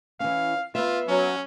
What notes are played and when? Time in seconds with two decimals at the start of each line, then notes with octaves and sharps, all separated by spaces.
0.20 E3 C#4 F5
0.75 B3 F4 B4 E5
1.08 F#3 C#4